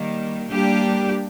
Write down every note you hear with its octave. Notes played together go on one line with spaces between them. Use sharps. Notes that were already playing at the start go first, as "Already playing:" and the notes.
Already playing: D#3 G3 A#3
G3 A#3 D4 G4